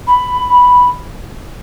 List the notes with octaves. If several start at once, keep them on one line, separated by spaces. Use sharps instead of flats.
B5